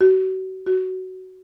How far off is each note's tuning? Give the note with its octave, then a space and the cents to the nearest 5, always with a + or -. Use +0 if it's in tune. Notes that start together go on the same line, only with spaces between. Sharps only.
F#4 +35
F#4 +15